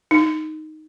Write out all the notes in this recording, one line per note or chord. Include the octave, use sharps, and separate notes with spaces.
D#4